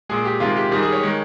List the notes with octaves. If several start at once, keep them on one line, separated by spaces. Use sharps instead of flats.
A#2 G#3 G#4
G4
C3 D#3 G#3 F4
G4
G#2 D#3 G3 G#4
G#4
C#5
D#3 G#3